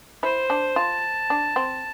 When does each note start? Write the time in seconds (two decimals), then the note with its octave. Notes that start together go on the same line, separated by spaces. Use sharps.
0.23 E4 C5
0.50 D4
0.76 F4 A5
1.30 D4
1.56 C4